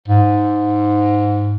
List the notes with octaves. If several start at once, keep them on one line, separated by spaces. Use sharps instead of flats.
G#2